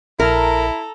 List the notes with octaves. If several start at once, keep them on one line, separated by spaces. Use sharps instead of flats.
A#1 E4 A4 A#4 A#5